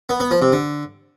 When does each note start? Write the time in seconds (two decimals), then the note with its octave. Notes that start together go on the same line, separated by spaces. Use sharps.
0.09 B3
0.20 B3
0.31 F3
0.42 C3
0.52 D3